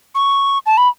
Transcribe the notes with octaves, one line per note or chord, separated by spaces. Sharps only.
C#6
A5
B5